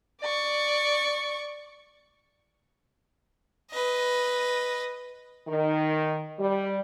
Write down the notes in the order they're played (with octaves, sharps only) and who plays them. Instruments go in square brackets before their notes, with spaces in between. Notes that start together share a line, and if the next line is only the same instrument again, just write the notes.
[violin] D5 C#6
[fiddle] B4 D#5
[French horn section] D#3
G3